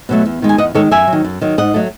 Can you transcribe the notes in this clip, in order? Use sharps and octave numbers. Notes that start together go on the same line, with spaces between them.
B2 F#3 A3
E2
D#3 G#3
G#5
E2 D#5 F#5
D#3 G#3 A4 C#5
F#2 E5 G#5
F#3
D#3
F#2
D#3 F#3
G#2 D#5 F#5
F#3 A3